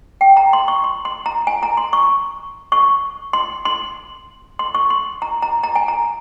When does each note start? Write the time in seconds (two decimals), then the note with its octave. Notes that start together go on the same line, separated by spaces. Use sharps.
0.21 G5
0.37 A#5
0.53 C6
0.68 C#6
0.84 C6
1.05 C6
1.26 A#5
1.47 G#5
1.63 A#5
1.77 C6
1.93 C#6
2.72 C#6
3.33 C6
3.65 C6
4.59 C6
4.75 C#6
4.90 C6
5.22 A#5
5.42 A#5
5.63 A#5
5.76 G#5
5.88 A#5